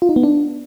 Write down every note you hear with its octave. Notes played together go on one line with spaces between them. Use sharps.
F4
D#4
B3
D4